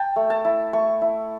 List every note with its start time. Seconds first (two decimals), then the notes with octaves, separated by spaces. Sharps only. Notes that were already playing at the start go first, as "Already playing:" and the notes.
Already playing: G5 A5
0.16 A3
0.30 A5
0.45 E4
0.73 A3 C#6
1.02 E4